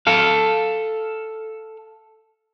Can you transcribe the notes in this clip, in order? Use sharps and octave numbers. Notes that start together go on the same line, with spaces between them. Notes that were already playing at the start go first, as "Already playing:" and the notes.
A4 F5